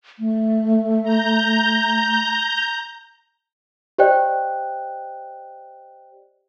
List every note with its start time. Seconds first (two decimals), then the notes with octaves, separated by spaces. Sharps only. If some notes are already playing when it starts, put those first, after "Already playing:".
0.19 A3
1.03 A#5 G6
3.98 G4 C5 D5 D#5 G5 F#6